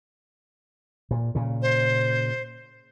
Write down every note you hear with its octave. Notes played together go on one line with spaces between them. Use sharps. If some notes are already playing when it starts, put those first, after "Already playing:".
A#2
A#2 C#3
C5